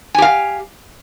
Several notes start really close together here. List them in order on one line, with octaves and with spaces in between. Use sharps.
G#5 G4 F5